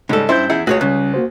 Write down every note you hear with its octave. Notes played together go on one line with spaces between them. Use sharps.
G#2 C#3 G3 A4
G2 C#4 E4 C5 G6
E2 E4 G#4 F#5
C#2 A3 F#4 G#4 C#5
C#3 G3 C#4 F#6
A#3 F#4 C5